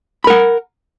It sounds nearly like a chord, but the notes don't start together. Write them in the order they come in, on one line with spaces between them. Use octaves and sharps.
B5 A#4 F#5